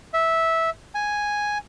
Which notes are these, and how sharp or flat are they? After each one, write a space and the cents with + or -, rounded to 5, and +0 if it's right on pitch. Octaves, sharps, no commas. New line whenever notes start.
E5 -10
G#5 +0